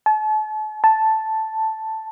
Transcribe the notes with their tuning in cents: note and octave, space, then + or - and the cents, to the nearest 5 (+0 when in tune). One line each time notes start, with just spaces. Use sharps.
A5 -40
A5 +0